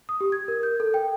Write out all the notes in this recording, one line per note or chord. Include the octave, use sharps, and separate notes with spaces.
D#6
G4
G#6
A#4
G6
A4
G5